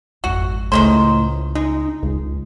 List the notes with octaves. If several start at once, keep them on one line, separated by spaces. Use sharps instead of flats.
G#1 F2 F#4
C#2 A2 D#3 G#3 C5
G#3 D#4
C#2 D#3 F4